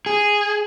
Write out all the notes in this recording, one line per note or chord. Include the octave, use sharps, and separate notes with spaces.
G#4